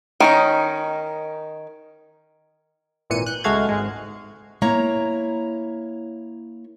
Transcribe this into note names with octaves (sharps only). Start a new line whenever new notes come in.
D#3 C#4 D#4
G#1 A#2 E3 C#7 D#7
F#6 G6
C#2 G#3 A3 F#4 F5 G#6
G#1 G#2 G#3
A#3 E4 C#5 A#5